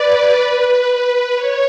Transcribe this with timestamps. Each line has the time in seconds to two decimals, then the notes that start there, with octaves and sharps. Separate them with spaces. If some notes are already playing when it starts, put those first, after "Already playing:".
Already playing: B4 D5
1.35 C#5